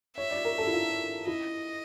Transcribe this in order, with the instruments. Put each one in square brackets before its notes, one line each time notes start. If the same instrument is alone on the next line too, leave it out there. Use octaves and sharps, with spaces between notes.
[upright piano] C#5 [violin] E5
[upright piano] D5
A#4
A4
E4
F4
[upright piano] E4 [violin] D#5